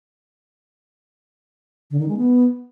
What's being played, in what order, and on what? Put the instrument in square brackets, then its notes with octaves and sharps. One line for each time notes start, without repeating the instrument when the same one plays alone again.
[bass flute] D3
D#3
G#3
B3